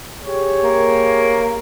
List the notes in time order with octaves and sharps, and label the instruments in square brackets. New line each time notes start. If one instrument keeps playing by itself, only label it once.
[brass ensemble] G4 G#4 C#5
[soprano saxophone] A#3